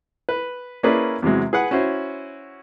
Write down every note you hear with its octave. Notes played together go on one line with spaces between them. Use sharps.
B4
A#3 C#4 E4 G#4 B4 D5
E2 C3 F#3 G#3
G#4 B4 F#5
C#4 E4 F#4 C5